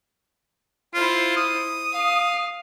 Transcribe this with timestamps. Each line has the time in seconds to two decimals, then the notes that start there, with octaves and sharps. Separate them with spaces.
0.94 E4 F4 C5
1.37 D#6
1.92 F5